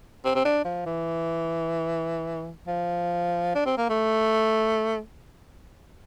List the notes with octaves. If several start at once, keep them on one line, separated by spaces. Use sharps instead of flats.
C4
C4
D4
F3
E3
F3
D4
C4
A#3
A3